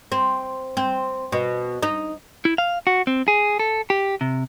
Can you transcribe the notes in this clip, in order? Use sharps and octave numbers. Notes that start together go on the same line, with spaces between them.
C4
C4
B2
D#4
E4
F5
F#4
C4
G#4
A4
G4
C3